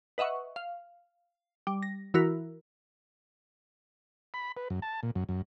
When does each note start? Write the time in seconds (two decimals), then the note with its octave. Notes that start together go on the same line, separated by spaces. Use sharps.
0.18 B4 D#5 E5 F#5 C#6
0.56 F5
1.67 G3
1.83 A#6
2.14 E3 E4 F#4 A#4
4.34 B5
4.57 B4
4.70 F#2
4.82 A5
5.03 A#2
5.16 F#2
5.29 F#2